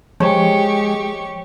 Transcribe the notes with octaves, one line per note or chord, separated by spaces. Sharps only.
F3 G#3 G4 C#5 C#6